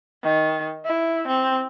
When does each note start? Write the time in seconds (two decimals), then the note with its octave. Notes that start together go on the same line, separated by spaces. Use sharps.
0.24 D#3
0.85 E4
1.28 C4